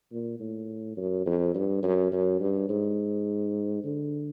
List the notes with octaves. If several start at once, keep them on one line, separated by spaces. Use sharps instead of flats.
A#2
A2
F#2
F2
G2
F#2
F#2
G2
G#2
D3